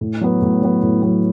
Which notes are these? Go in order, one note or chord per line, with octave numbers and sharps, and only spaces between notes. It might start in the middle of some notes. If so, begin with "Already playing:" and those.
A2
F#3 B3
A2
F#3 B3
A2
F#3 B3